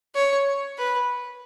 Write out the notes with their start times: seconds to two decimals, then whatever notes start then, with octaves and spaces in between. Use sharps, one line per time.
0.15 C#5
0.78 B4